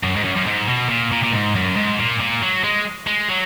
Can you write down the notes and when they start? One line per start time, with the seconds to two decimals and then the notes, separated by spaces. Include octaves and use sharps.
0.03 F#2
0.16 G#2
0.24 F#2
0.36 F#2
0.47 G#2
0.68 B2
0.89 A#2
1.12 A#2
1.24 A#2
1.32 G#2
1.55 F#2
1.76 G#2
1.99 A#2
2.20 A#2
2.42 F#3
2.63 G#3
3.07 G#3
3.29 F#3